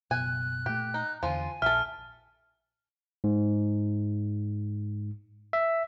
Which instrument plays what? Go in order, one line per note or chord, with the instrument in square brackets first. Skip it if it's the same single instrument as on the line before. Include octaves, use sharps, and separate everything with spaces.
[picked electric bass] F#1 B2 [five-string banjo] G#5 [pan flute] F#6
[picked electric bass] A#2 A3 [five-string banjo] G4
[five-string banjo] D#4
[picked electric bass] E2 D3 [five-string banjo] F3 F4 [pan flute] G#5
[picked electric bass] A#1 [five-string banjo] A4 E5 [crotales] F6
[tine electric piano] G#2
E5